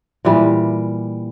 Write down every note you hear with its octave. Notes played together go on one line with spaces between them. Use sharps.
A#2 E3 G3